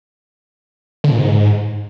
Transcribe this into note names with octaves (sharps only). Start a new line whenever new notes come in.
D3
A#2
G#2